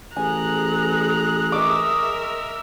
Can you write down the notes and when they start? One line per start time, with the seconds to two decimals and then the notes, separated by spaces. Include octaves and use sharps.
0.16 A1 G#4 G#5 A#5 F#6
1.52 A#4 D#5 E5 C#6 D6